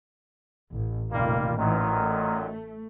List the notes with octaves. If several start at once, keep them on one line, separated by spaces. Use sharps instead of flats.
A1
F1 A#2 D#3 G3 A#3 F4
A1 F#2 A#2 D#3 E3
A3